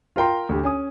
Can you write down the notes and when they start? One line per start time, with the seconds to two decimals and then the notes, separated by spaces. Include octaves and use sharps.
0.16 F4 A#4 G5 A#5 C6
0.49 D2 G4
0.63 C#4 G#5 D#6